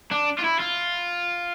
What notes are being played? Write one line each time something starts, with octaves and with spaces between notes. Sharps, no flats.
D4
F4
E4
F4